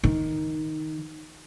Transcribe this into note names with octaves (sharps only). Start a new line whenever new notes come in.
D#3